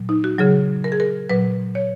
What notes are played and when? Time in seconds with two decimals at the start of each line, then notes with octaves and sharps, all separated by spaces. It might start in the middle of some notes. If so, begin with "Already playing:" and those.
Already playing: A#2 F#3
0.09 D#4
0.24 F#4
0.39 C#3 F#3 G#4
0.84 A#4
0.92 G#4
1.00 A#4
1.29 A#2 F#3 B4
1.75 C#5